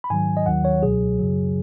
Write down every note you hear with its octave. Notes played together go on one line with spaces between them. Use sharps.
B5
G#2 D#3 F#3 G#5
D#5
D#2 D#3 F#3 F#5
C#5
C#2 B2 F#3 G#4
F#2 C#3 F#3